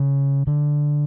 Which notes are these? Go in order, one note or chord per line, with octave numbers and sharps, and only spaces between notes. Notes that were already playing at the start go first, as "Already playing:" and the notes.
Already playing: C#3
D3